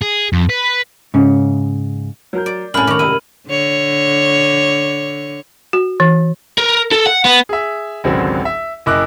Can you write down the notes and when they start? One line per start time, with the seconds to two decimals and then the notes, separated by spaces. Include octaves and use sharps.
0.02 G#4
0.33 F2
0.49 B4
1.14 G#2 C#3 C#4
2.33 F#3 A#4 G6
2.46 D5
2.74 C2 F#2 A2 G#5 B5 F6 F#7
2.87 D#3 A#5 C#6 D6
2.99 G#1 C3 E4 D#7
3.47 D3 C#5
5.73 F#4
6.00 E3
6.58 A#4
6.91 A4
7.06 F#5
7.25 B3
7.49 G#4 E5
8.04 G#1 C#2 D3 F#3 C4
8.45 E5
8.86 F#1 E4 D#5 D6 F#6